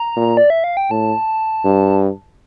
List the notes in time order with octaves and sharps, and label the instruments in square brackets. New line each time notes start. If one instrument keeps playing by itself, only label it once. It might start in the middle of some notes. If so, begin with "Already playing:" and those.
Already playing: [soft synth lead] A#5
[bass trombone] A#2
[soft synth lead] D5
E5
F5
G5
[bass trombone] A2 [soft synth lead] A5
[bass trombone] G2